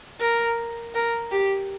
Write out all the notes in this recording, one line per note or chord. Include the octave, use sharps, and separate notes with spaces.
A#4
A#4
G4